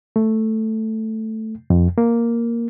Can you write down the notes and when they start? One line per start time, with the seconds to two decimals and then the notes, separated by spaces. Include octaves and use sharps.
0.16 A3
1.70 F2
1.98 A#3